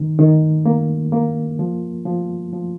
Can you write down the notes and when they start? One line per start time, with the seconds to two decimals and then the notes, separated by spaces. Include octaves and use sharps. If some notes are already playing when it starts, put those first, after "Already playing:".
Already playing: D#3
0.19 D#3
0.66 A#3
1.12 A#3
1.59 F3
2.05 F3
2.52 F3